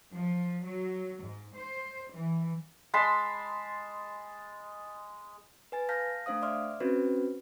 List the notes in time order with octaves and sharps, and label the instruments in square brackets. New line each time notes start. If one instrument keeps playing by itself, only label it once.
[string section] F3
F#3
G#2
C5
E3
[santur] G#3 A5 B5 C6
[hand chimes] B4 G#5 A6
F5 A5 F6 G6 A#6 B6
A3 D4 C5 F5 D#6
D5 E5 C6 D6 F6
C4 C#4 F#4 B4 C5